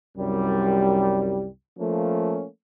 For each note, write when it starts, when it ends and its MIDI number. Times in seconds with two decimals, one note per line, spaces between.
0.17 1.47 36
0.17 1.47 42
0.17 1.47 55
1.79 2.46 53
1.79 2.46 57
1.79 2.46 58
1.79 2.46 61